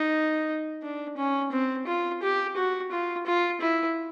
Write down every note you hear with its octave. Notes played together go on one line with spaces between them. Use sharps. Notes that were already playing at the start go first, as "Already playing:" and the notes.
Already playing: D#4
D4
C#4
C4
F4
G4
F#4
F4
F4
E4